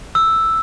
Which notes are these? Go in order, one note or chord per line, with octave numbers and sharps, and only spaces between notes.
E6